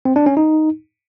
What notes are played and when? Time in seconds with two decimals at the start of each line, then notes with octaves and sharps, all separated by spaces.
0.05 C4
0.16 D4
0.26 C#4
0.37 D#4